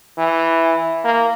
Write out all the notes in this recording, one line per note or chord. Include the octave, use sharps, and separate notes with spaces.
E3
A#3